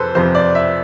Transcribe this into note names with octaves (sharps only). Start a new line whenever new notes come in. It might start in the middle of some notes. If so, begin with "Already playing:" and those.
Already playing: F2 C3 A4 B4 C5
F2 C3 F3 C5
D5
E5